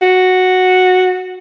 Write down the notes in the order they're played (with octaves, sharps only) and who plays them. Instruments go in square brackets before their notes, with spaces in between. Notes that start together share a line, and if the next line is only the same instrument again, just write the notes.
[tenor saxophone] F#4